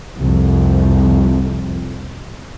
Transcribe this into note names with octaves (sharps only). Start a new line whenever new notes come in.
C2 F2